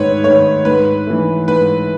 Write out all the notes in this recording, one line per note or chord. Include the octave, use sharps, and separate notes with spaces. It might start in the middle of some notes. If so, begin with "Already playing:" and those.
Already playing: G#2 D#3 A3 B4 C#5
D#3 A3 C#5
G#2 B4
E3 A3
G#2 B4